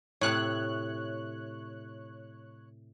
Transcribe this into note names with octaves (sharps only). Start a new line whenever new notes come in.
A2 C3 C#5 F#6